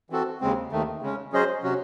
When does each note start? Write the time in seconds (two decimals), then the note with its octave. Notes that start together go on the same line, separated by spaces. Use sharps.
0.10 E3 C4 F#4 A4
0.41 D#2 C#3 G#3 C4
0.72 D#2 D#3 A3
1.02 C#3 G#3 C#4
1.32 F#3 C#4 G#4 C5 D#5
1.63 C3 F#3 C#4 F#4